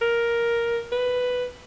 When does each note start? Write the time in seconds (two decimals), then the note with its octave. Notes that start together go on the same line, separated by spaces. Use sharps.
0.02 A#4
0.92 B4